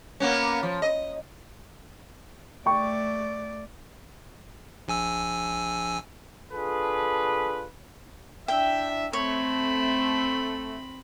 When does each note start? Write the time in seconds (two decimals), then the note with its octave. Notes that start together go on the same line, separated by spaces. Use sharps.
0.20 A#3 B3 C#4
0.63 F3
0.82 D#5
2.66 A3 D5 G5 C#6
4.88 A#1 G#5 E6
6.53 D4 F4 G#4 A4 B4
8.48 D4 E4 E5 G5
9.13 A3 C4 C#5 B5